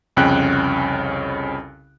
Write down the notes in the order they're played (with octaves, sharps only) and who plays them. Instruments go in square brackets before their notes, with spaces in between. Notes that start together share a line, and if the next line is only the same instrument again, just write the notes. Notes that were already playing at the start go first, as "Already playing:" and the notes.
[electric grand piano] C2 F2 C#3 C#4 G5 F#6